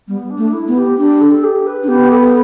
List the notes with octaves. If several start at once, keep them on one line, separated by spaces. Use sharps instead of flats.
G3 B3
D4
A3
E4
B3
G4
D4 G4
A4
G4
B4
D4
B3 G4
A4